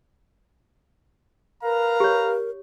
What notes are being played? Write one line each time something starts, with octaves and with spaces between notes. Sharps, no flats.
A#4 B4 F5 A#5
G4 C#5